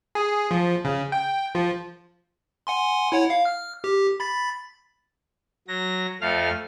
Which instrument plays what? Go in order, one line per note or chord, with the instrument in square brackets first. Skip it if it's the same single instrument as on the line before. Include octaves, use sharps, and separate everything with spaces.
[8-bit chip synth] G#4
F3
C#3
G5
F3
F#5 G#5 C6
E4 C#5 F#5
F5
F6
G4
B5 A6 B6
[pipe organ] F#3 A#6
F2 A3 F5 F6